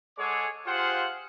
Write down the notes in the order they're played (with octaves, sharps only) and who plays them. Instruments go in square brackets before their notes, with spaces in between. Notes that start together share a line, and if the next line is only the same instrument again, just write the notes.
[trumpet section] G#3 G#4 A4 C#5 F#5 D6
F4 G4 G#4 C5 F5 F#5